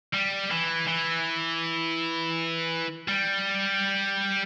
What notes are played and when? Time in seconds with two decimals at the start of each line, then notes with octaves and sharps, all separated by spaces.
0.14 G3
0.51 E3
0.88 E3
3.08 G3